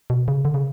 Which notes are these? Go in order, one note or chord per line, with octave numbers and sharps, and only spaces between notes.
B2
C#3
D3
C#3